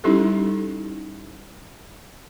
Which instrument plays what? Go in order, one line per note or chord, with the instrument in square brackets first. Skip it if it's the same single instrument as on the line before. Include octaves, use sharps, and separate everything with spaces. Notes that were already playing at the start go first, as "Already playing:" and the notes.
[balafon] G3 C#4 D#4 E4 G4 A4